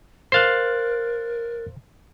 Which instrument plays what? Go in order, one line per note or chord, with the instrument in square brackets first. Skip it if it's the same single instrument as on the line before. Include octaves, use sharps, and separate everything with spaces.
[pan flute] A#4 [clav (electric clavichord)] C5 F5 [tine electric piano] F#6 A6 C7